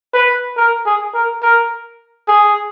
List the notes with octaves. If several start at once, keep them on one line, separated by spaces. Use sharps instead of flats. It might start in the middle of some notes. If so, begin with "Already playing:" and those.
B4
A#4
G#4
A#4
A#4
G#4